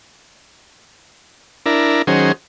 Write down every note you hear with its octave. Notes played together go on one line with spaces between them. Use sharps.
D4 E4 A#4
D#3 F#3 C#4 G#4 C5